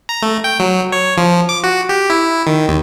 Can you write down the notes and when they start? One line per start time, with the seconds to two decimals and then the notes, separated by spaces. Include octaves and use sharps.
0.09 A#5
0.22 A3
0.44 G5
0.59 F#3
0.92 C#5
1.17 F3
1.49 D6
1.64 F#4
1.89 G4
2.10 E4
2.47 D#3
2.68 D#2